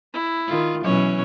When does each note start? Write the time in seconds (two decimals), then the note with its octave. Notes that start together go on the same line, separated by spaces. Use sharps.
0.14 E4
0.47 D#3 F4
0.84 B2 E3 F#3 C#4 C#5